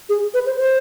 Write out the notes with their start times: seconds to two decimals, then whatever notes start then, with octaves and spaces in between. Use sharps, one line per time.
0.09 G#4
0.34 B4
0.46 C5
0.58 C5